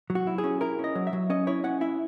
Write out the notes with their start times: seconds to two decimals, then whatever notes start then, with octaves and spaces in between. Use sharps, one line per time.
0.10 F#3
0.15 F#4
0.27 E4
0.38 G#4
0.44 C#4
0.61 E4 A#4
0.79 C#4 D#5
0.95 F#3
1.07 E5
1.13 F#3
1.30 C#4 D#5
1.47 E4 C#5
1.64 C#4 F#5
1.81 E4 E5